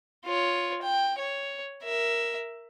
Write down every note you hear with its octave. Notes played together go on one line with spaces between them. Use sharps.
F4 C#5
G5
C#5
A#4 E5